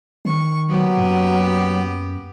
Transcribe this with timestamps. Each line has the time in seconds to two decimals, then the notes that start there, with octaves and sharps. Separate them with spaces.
0.25 D#3 C#6
0.68 F#3 A#3 B3 G4
0.97 F#2